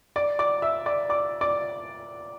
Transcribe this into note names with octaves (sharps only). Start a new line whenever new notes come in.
D5 D6
D5 D6
E5 E6
D5 D6
D5 D6
D5 D6